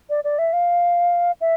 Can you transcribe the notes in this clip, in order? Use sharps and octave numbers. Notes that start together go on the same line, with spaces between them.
D5
D5
E5
F5
E5